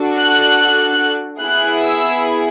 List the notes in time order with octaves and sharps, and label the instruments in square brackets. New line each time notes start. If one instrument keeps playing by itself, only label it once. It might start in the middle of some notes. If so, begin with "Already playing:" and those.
Already playing: [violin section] D4 F#4 A4
F#6
B3 E4 G#4 F#6
E6